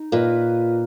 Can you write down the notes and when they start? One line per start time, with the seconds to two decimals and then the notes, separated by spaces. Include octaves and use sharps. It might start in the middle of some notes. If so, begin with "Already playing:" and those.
Already playing: D#4
0.12 A#2 A#3 F4 B4 D#5